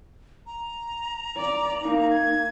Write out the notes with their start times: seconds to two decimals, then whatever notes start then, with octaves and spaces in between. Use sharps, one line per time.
0.46 A#5
1.37 D5
1.81 A#3 D#4
2.10 G#6